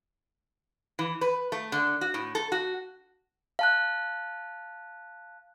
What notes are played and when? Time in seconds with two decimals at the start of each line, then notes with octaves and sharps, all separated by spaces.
0.99 E3
1.21 B4
1.52 A3
1.72 D3
2.01 F#4
2.14 A2
2.35 A4
2.52 F#4
3.59 F5 A5 F#6